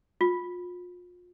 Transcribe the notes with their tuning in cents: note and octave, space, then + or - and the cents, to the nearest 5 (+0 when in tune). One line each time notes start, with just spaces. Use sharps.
F4 +35